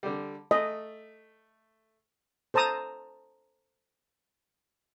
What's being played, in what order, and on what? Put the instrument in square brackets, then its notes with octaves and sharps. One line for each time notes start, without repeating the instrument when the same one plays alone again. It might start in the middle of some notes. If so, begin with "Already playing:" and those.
[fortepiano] D3 G3
[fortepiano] A3 [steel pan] D#5
[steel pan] A4 C5 A5 A#5 D#6